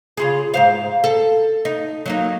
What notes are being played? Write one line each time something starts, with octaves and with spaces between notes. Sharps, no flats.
C#3 F4 G#4
G#2 C5 F5
A4
D#4
F#3 A#3 D#4